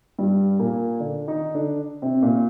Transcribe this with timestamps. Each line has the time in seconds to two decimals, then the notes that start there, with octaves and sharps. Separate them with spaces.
0.19 G2 G3
0.59 A#2 A#3
1.00 D3 D4
1.27 D#3 D#4
1.54 D3 D4
2.02 C3 C4
2.22 A#2 A#3